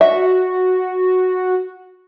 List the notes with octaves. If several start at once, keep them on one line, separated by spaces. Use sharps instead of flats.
F#4 E5